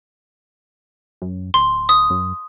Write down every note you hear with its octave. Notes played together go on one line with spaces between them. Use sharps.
F#2
D1 C6
D#6
F#2